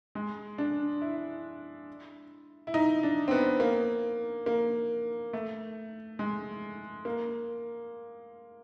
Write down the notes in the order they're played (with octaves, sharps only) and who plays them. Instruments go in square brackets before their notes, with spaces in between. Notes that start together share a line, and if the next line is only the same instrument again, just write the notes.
[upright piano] G#3
D4
E4
E4
D#4
D4
C4
B3
A#3
A#3
A3
G#3
A#3